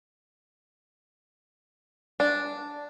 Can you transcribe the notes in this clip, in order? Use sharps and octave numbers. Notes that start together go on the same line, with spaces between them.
D4